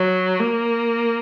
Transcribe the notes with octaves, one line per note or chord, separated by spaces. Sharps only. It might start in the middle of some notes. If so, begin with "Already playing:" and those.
Already playing: F#3
A#3